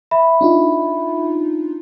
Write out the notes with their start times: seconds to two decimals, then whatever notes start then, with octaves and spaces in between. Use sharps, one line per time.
0.11 E5 B5
0.41 D4 D#4 F4